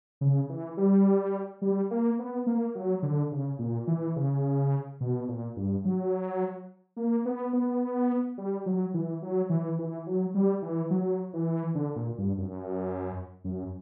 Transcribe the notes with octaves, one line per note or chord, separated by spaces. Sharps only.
C#3
E3
G3
G3
A#3
B3
A#3
F#3
D3
C#3
A#2
E3
C#3
B2
A#2
G2
F#3
A#3
B3
B3
G3
F#3
E3
F#3
E3
E3
F#3
G3
E3
F#3
E3
D3
A#2
G2
F#2
F#2